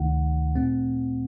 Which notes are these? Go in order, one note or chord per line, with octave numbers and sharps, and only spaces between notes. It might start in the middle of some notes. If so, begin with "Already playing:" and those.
Already playing: D2 C3 D#3 A3 D#4 F#5
A#2 A3 C4